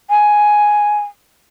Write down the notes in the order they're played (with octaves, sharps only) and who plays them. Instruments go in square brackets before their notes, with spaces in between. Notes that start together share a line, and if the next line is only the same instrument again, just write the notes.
[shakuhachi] G#5